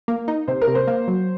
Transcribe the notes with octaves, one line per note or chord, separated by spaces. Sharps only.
A#3
D#4
C3 C5
A#4
C3
C5
A#3
F#3